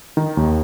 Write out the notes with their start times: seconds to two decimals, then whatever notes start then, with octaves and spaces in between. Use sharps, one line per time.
0.17 D#3
0.37 D#2